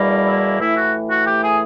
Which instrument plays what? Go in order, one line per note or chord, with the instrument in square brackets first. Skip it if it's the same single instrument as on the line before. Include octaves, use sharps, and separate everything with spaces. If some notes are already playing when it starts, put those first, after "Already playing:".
Already playing: [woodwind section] E2 B2 G3 A#3
E4
A2 E3 A3 E4
F#4
F#4
G4
G#4